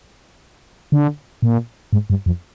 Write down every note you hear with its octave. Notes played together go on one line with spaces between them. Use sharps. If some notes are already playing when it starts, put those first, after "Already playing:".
D3
A#2
G#2
G2
F2